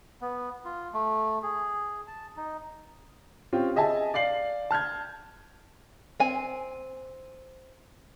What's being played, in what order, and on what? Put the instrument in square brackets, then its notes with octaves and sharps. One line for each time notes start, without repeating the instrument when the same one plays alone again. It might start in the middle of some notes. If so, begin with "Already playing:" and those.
[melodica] B3
F4
A3
G#4
A5
D#4
[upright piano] C4 C#4 F4 G4
G#4 D#5 E5 G#5 A5
D5 F5 C7 F#7
A5 F6 G6 G#6
[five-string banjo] C4 G#5